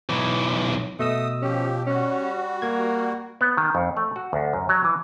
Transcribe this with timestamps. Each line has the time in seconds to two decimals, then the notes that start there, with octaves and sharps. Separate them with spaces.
0.09 B1 E3
0.99 B2 A3 D#5 D#6 E6
1.42 F3 C#4 G4
1.87 G3 C#4 F#4
2.62 A#3 G#6
3.41 B3
3.57 D#3
3.75 F2
3.97 A3
4.16 F#4
4.33 D2
4.53 F#2
4.69 F#3
4.84 E3